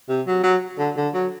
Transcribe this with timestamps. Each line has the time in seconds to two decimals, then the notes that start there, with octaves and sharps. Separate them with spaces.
0.09 C3
0.27 F#3
0.43 F#3
0.78 D3
0.96 D3
1.14 F#3